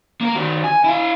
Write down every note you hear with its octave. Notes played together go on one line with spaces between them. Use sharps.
A#3 A#4
D#3 F#4
G#5
E4 F5